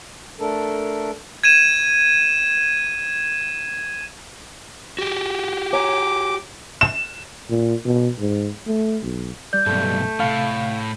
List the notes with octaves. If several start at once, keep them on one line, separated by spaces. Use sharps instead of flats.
A3 D4 A4 A#4
G#6 D#7 E7
F#4 G4
C#5 G#5 A#5 D6
E7
A#2
B2
G#2
A3
B1
G3 D5 G6
B1 G2 A3
A2 C3 F5